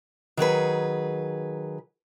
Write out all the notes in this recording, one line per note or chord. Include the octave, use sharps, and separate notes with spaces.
D#3 F#3 G#4 B4